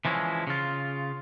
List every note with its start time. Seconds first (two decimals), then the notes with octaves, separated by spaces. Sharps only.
0.05 E3 F3 G#3 C#4 E4
0.47 C#3 F4